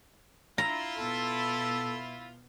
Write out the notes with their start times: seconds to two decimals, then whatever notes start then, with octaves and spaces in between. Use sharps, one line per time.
0.58 E4 F4 A#5
0.97 B2 B3 A4